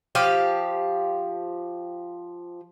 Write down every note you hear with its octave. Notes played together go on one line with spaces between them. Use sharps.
F3 G4 F5